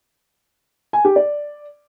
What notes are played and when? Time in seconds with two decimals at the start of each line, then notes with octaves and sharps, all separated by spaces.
0.93 G#5
1.05 G4
1.16 D5